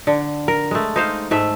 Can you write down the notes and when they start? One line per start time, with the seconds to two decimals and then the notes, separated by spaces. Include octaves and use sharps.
0.07 D3
0.48 A#4
0.71 G#3 A3
0.96 D#4 C5 F5
1.31 G#2 A3 E5